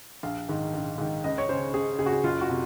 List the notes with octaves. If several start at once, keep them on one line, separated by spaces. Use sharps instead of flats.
A#1 F5
G#2 D#3
A#1
G#2 D#3
C#2 D#5
C#5
C#3 C5
C#2 G#4
C#3 G#4
F#4
G#4
F#1 F4
F#4
C3